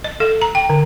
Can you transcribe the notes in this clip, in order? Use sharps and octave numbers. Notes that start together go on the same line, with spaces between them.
D#5
A4
A#5
G5
D3